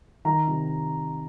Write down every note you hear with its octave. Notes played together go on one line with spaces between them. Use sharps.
D#3 A#5
C3